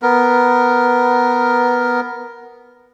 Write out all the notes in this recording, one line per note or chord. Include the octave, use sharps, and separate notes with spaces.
B3 A#4